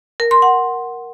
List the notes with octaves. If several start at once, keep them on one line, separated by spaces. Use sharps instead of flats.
A#4
C6
F#5